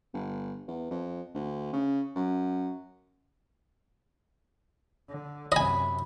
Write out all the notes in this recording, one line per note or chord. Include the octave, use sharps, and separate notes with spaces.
G1
E2
F2
D2
C#3
F#2
D3
F#2 C3 D#5 G#5 B5